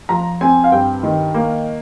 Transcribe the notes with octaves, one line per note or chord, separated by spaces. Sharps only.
F3 A#5
C4 G#5
F5
G2 G5
D#3
A#3